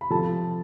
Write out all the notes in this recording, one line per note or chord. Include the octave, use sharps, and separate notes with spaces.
B5
C3 F3 A4 A5